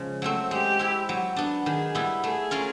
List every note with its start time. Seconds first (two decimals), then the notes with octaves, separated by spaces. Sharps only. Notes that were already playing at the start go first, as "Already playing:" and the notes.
Already playing: C#3 F3 G#3
0.22 F#3 A3 C4
0.51 G#3 G4
0.79 C4 E4
1.09 F#3
1.36 B3 D4
1.66 D#3 G#4
1.95 G3 B3 E4
2.23 A3 G#4
2.51 C#4 F4 A#4